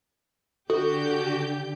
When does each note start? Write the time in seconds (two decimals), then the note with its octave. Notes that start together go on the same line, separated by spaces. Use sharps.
0.70 D3 F#4 G4 A4 G6